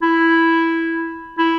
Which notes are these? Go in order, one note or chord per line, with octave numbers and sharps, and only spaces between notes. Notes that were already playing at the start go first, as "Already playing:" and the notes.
E4
E4